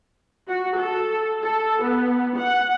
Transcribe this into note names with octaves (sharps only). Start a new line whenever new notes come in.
F#4
A4
A4
B3
F#5